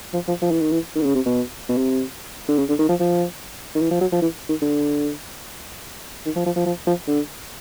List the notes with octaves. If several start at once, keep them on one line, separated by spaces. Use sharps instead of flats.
F3
F3
F3
E3
D#3
E3
D#3
D3
C#3
C3
B2
B2
C3
D3
C#3
D3
D#3
F3
F3
D#3
E3
F3
F#3
F3
E3
D#3
D3
D#3
F3
F3
F3
F3
F3
D3